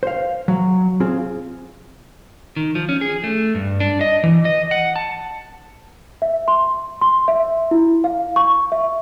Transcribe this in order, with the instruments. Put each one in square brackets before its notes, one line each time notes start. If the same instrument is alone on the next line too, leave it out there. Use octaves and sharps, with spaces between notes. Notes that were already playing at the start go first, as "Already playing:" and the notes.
[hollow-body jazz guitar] C5 F5
F#3
C4 F4 G#4
[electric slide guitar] D#3
F3
C#4
G#4
A3
G2
D4
D#5
E3
D#5
F#5
A5
[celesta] E5
C6
C6
E5
E4
F5
C#6
E5